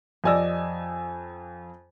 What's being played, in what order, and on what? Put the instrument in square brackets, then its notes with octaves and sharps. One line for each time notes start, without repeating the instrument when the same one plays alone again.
[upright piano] F2 G#5 E6 [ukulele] G4 D5 D#5